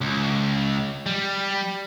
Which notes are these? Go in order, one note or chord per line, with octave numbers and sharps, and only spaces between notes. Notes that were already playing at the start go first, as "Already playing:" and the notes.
C#2
G3